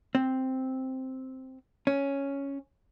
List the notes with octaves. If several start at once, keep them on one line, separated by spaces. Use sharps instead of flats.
C4
C#4